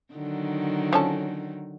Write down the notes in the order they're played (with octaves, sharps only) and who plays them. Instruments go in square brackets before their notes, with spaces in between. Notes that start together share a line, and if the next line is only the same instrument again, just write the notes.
[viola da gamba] D3 D#3 F#3
[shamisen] F3 C#4 A4